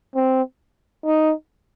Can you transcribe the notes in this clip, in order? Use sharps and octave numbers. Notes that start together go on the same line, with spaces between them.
C4
D#4